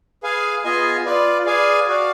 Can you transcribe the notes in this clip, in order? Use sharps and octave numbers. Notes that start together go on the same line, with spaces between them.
G#4 B4 F5 G#5
B3 F4 G#4 D#5 G#5
F4 B4 D5
G#4 B4 D5 F5 G#5
F#4 D5 F5